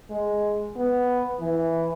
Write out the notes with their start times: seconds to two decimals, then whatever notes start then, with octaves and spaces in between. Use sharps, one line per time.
0.10 G#3
0.76 B3
1.40 E3